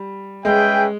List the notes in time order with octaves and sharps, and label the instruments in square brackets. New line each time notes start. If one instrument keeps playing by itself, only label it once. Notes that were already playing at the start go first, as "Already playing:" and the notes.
Already playing: [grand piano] G3
[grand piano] G#3 [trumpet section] C#4 G#4 B4 E5 G5